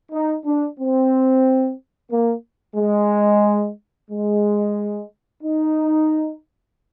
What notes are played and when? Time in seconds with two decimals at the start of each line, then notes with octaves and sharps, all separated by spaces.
0.12 D#4
0.44 D4
0.78 C4
2.10 A#3
2.76 G#3
4.10 G#3
5.42 D#4